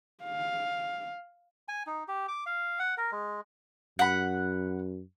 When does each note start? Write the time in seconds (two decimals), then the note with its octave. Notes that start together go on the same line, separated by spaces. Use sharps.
0.24 F5
1.68 G#5
1.87 D#4
2.08 G4
2.28 D6
2.46 F5
2.79 F#5
2.97 A#4
3.12 G#3
3.99 F#2 F#5 B5